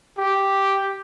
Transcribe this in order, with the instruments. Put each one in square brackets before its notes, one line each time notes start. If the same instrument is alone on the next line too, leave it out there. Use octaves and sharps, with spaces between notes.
[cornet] G4